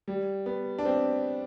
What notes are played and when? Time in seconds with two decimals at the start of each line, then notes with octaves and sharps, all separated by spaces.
0.08 G3
0.46 B3
0.78 D4
0.85 C4